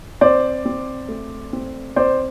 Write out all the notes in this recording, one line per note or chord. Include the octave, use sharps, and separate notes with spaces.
C4 C5 D5
C4
A3
C4
C4 C5 D5